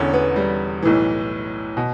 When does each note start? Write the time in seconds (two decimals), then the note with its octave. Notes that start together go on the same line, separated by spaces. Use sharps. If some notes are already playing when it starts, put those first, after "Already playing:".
Already playing: E1 E2 D3 C#4
0.13 B3
0.36 G3
0.82 B1 A2 E3
1.77 B2